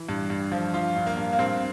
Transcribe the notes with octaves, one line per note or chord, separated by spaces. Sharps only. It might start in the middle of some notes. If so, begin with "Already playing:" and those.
Already playing: E3
G2
G2
F3
F3 F4
G2
A#3
G2
A#3
G2 C4